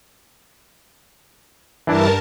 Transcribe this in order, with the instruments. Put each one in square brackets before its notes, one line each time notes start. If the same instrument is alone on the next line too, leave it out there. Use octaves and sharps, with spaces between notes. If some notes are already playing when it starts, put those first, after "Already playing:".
[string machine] G2 A#4 A5 [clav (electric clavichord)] E3 D4 E4